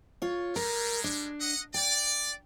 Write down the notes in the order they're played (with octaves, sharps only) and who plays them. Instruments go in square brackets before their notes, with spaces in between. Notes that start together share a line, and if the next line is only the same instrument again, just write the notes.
[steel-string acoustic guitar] F4 C#5
[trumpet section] G3 G#3 [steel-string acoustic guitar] A#4
[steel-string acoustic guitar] D4
[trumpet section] D#5 F#5
[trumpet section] D5 [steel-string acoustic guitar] G5